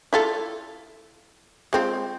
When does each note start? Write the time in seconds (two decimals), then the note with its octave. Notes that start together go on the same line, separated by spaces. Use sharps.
0.13 E4 F4 A4
1.73 G#3 C4 F4